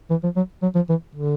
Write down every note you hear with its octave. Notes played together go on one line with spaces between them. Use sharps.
E3
F3
F#3
F#3
F3
E3
D3